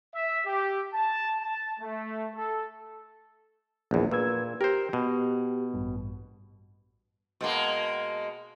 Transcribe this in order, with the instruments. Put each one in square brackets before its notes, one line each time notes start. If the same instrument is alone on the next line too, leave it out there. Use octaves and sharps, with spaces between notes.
[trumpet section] E5
G4
A5
A5
A3
A4
[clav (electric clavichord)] A#1 E2
[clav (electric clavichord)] A#2 [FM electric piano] B4 E6 G#6
[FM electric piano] G4 [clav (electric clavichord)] A#4 C5
[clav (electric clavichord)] B2
[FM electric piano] A1 G2
[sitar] B2 G#3 A#3